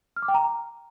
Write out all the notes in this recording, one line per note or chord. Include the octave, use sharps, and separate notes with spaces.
F6
D6
G5
A#5